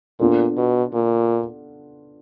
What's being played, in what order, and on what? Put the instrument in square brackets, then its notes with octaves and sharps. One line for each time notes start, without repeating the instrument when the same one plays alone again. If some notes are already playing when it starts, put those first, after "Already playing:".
[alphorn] A#2 [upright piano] B3 D4 F4 A4
[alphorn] B2
A#2